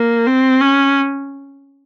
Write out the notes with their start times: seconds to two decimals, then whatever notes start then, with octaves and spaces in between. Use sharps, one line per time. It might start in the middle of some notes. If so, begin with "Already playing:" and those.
Already playing: A#3
0.27 C4
0.61 C#4